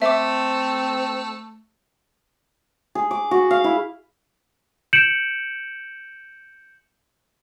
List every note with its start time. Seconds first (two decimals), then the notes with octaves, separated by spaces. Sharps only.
0.02 A3 C4 E5 D6
2.95 G#4
3.11 D6
3.31 F#4
3.51 F5
3.64 E4
4.93 G6 C#7 D7 E7 F#7